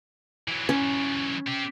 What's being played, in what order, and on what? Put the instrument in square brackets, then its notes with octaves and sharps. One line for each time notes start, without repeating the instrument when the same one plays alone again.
[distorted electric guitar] E3 F#3
[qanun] C#4
[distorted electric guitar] C4 G4